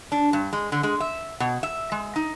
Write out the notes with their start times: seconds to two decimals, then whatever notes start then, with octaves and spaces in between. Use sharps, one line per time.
0.12 D4
0.33 G2
0.53 G#3
0.72 D3
0.83 G#3
1.00 E5
1.40 B2
1.63 E5
1.92 G#3
2.16 D#4